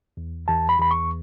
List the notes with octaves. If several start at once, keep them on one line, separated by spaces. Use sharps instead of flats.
E2
E2 A5
B5
E2 B5
C#6